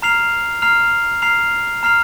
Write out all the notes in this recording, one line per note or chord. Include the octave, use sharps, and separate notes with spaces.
A#5 F6 C7 F7
A#5 F6 C7 F7
A#5 F6 C7 F7
A#5 F6 C7 F7